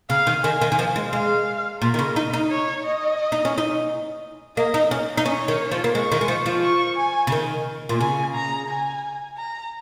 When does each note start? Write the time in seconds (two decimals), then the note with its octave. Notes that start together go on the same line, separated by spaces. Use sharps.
0.10 C#3 F5
0.27 D#3
0.44 D#3 G#5
0.61 D#3
0.72 D#3
0.79 F3
0.96 G#3
1.13 G#3 F5
1.82 A#2 A#4
1.94 D#3
1.99 C#3
2.16 D#4
2.33 D#4
2.50 C#5
2.84 D#5
3.32 D#4
3.45 C#4
3.58 D#4
4.57 A#3 D#5
4.74 D#4
4.91 C#4
5.17 D#4
5.25 C#4 C#5
5.48 D#3
5.71 F3
5.84 A#3
5.95 G#3 C#6
6.12 D#3
6.21 G#3
6.28 F3
6.46 F3
6.63 C#6
6.97 G#5
7.27 C#3
7.32 D#3
7.89 A#2
8.00 C#3 G#5
8.35 A#5
8.69 G#5
9.38 A#5